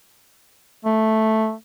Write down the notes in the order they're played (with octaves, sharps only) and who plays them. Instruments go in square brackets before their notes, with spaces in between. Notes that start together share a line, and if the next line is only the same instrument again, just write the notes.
[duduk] A3